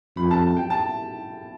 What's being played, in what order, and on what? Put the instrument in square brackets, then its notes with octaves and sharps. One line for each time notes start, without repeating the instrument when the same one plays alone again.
[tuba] F2 [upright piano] B5
[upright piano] A5
G5
A5